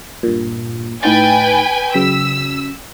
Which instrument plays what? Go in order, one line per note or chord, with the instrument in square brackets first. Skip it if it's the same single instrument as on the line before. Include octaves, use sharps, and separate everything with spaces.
[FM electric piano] G2 A#2
[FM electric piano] A2 D#4 A6 [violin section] B4 G5 G#5
[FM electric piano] C#3 F#3 B6 [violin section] E6